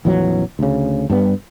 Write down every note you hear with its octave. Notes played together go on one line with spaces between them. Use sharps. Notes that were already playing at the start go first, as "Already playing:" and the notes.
A#1 F2 E3 F#3
D2 C#3
G2 G3 B3